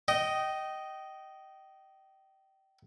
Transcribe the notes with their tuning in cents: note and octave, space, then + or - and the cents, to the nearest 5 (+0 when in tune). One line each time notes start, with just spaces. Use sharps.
D#5 +0 G5 -30